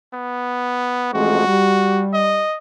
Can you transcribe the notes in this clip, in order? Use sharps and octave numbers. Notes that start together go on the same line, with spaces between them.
B3
A1 F2 G#3 F#4
G3
D#5